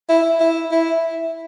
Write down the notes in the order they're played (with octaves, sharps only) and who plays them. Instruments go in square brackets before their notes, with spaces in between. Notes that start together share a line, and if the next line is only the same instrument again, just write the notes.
[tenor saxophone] E4
E4
E4